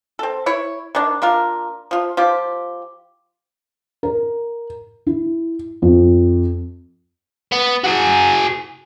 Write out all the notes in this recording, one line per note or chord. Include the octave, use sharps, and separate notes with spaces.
C4 A4
E4 C#5
D#3 D4
A#3 D4 F4 A#4
F3 F4
F3 F4 G4
A#4
E4
F2
B3
F#4 G#4